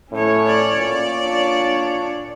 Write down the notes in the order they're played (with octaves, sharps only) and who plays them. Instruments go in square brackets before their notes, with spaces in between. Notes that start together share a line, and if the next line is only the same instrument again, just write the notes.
[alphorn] A2 [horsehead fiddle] C#4 C#5
[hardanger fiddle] D5
[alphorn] A#2
[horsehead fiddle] D4 C#5